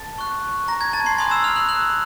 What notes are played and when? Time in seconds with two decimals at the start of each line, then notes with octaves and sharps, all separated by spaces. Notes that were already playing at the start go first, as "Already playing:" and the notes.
Already playing: A5 A6
0.18 C#6 F#6
0.68 A#5 A#6
0.81 G#6
0.93 A5 A6
1.06 C6 C7
1.18 G#5 B5 C6 D#6 F#6 C7
1.31 E6 E7
1.44 F6 F7
1.56 F#6 F#7
1.69 F#6 F#7